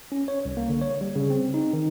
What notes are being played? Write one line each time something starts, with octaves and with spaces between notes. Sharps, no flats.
C#4
C#5
C2
A#3
D3
C#5
G3
C#3
C4
D#4
D#3